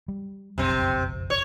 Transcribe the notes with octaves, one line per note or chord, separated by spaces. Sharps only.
G3
F#1 B1 F2 C3 C4
C#5